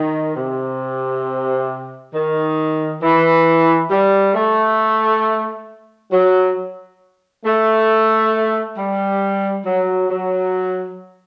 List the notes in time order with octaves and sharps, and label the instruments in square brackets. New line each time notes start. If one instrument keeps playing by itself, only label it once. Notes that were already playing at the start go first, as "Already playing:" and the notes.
Already playing: [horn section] D#3
C3
D#3
E3
G3
A3
F#3
A3
G3
F#3
F#3